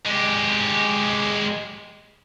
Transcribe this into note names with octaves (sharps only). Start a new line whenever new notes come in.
G#3 G4